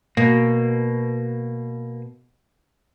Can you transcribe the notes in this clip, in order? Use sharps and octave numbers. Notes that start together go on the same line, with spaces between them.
B2 A#3